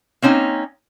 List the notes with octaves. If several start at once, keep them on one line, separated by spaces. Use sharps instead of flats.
A#3 C4 C#4 D#4